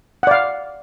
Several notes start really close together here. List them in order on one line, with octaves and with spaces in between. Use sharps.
F#5 D5 F5